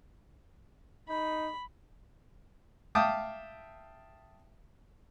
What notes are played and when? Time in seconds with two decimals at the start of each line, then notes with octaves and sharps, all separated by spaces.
1.09 D#4 B5
2.95 E5 F5 G5 A5 D6 D#6